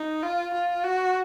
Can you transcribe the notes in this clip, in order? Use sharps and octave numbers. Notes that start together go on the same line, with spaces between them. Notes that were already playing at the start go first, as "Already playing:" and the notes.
Already playing: D#4
F4
F4
F#4